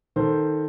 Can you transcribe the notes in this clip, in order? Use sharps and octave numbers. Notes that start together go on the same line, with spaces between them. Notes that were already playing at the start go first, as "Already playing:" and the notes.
D#3 A4 C5